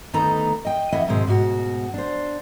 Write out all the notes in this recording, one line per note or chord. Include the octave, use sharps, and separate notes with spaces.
D2 D#3 B3 D#4 A4 A#5
D#5 G5
F2 E3 E4 D#5 E5 F#5
G#2 B2 D#3 G#3 C4
G#2 B2 F#4
D4 C5